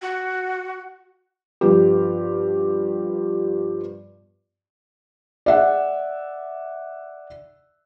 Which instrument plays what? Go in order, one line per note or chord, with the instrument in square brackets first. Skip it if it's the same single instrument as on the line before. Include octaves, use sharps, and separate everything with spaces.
[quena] F#4
[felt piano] G2 F3 B3 F4 G4
D5 E5 F#5